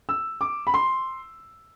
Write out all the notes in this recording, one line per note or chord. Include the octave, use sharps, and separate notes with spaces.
E6
D6
B5
C6